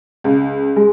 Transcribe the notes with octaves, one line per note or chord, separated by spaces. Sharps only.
C#2
G#3